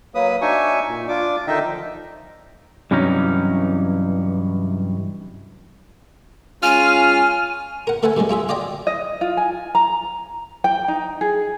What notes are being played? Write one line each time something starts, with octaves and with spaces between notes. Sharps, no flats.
F#3 A#3 B4 D#6
D4 D#4 F#4 E5 G#5 C#6
A#2
D4 F4 D6
D3 D#3 D#4 D#5 E5 G5
F3
G2 C3 E3 F#3 C#4 D#4
G#3 C#4 F4 G#5 F6
A#4 F#5
A3 A4 B4 F#5 G#5
C3 D#3 G3 G#3
E4 F4 G#4 E5
F4 D5 D#5 G5
D#5
F4
G#5
A#5
G5
D#4
G#4